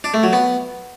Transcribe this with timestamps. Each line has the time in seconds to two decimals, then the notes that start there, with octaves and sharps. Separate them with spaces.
0.04 D4
0.14 A3
0.23 F#3
0.33 B3